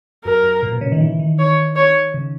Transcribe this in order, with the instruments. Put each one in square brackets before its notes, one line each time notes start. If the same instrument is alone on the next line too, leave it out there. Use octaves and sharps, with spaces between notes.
[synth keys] F#2 [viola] A#4
[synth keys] F#2
A#2
B2
C#3
D#3
E3
D#3
[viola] C#5
C#5
[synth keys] C#3